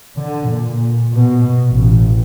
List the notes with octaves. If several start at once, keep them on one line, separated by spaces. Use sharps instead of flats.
D3
A#2
B2
A1